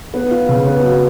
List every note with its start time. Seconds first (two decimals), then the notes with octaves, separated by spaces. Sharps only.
0.14 B3
0.31 F4
0.49 C#3
0.66 B3
0.83 F#3